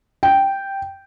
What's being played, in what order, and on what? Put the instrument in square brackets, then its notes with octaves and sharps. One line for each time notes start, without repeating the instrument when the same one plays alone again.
[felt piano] G5